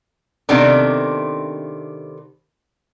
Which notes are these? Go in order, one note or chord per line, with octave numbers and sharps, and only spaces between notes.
C3 D#3 A3 B3 C4 D4